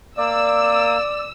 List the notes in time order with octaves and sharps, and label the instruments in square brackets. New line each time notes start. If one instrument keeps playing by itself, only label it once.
[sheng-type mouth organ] A#3 [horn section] D5 [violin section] E6